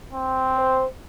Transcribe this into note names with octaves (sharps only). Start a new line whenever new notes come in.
C4
C5